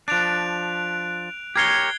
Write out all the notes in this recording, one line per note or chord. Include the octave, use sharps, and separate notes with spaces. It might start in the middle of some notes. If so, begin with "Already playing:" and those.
F3 D4 F#6 D7 F7
G4 A#4 C#5 G#6 C7 G7